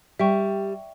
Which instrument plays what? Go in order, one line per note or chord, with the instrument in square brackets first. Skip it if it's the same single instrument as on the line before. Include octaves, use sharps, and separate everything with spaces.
[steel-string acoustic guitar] G3 [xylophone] E5 G5 C#6